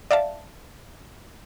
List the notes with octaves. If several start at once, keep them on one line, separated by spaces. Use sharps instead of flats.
D5 E5 F5 A5